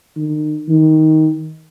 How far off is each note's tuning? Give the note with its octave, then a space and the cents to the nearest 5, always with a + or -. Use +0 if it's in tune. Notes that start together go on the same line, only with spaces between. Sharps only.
D#3 -35
D#3 +15